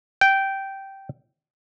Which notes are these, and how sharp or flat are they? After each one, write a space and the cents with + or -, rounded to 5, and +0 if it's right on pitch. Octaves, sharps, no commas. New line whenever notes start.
G5 -10